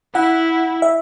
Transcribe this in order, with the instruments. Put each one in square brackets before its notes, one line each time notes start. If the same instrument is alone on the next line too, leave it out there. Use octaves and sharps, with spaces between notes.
[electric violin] E4 [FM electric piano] F#5
[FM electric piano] E5